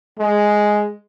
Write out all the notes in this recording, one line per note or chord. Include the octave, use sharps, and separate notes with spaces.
G#3